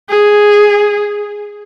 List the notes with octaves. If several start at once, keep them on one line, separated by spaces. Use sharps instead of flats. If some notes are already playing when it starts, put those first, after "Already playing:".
G#4